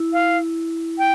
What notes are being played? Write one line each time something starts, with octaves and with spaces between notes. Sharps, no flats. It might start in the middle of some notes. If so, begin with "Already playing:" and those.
Already playing: E4
F5
G5